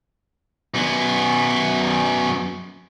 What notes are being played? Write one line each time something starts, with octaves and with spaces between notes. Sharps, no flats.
F#2 B3